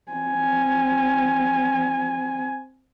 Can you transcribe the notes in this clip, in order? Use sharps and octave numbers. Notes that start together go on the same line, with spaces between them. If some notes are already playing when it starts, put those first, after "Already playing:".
C4 G#5